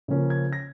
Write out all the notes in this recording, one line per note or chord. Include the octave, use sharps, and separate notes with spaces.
C#3 F3 A#3 C#4
G#6
A#6